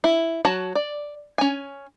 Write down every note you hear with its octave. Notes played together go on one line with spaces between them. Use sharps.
E4
F#3 F#4 A5
D5
C#4 G#5